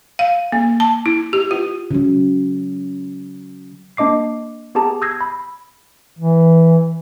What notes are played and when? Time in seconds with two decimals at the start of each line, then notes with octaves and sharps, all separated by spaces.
0.19 F5
0.52 A#3
0.80 A5
1.06 E4
1.33 G4
1.51 F4
1.91 C#3 F#3
3.97 A#3 D4 D#5 D6 C7
4.75 B3 G4 G#4 A5 A#5
5.02 D#6 E6 G6 G#6 A#6 C7
5.21 B5
6.19 E3